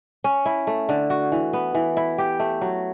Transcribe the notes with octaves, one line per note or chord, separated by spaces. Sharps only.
C#4
E4
A3
D3
F#4
E3
B3
E3
E4
G4
A3
F#3